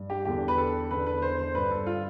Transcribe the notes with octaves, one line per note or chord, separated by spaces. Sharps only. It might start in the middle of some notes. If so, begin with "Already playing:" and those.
Already playing: G2
G4
E2 D3 G4
B4
A4
E2 D3 B4
B4
C5
C5
G2 D3 B4
A4
F4